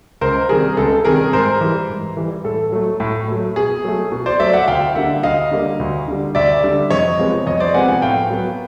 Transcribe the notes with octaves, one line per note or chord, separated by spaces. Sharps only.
C#2 A#4 C5
C3 D#3 G3 G#4 A#4
C#2 A4
C3 D#3 G3 G#4 A#4
G#2 A#4 C5
E3 G3
G#2
E3 G3
A2 A4
F#3 A3
A2
F#3 A3
B2 G#4
F#3 A3
B2
C5 D5
F#3 A3 D5 E5
E5 F#5
D2 F5 G5
D3 G3 A#3 E5 F#5
D2 D#5 F5
D3 G3 A#3
D2
D3 G3
D2 D5 E5
D3 G3
F2 C#5 D#5
C3 F3 G#3 B3
F2 C#5 D#5
C5 D5
C3 F3 G#3 B3 F#5 G#5
F#5 G#5
A2 F5 G5
F#3 B3